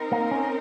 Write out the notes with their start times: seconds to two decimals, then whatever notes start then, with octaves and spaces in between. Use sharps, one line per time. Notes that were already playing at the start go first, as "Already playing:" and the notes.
Already playing: C4 D#4 A#4
0.12 A#3
0.31 C#4